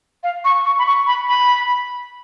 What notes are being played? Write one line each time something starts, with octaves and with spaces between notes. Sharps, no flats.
F5
C#6
C#6
B5
C#6
B5
B5